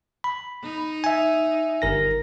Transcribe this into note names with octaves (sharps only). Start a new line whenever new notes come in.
B5
D#4
E5 G#5
G1 A#4 A#6